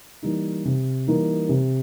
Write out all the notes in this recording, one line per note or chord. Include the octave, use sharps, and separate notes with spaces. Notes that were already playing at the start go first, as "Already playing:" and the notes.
E3 G3 A#3 D#4
C3
E3 G3 A#3 D#4
C3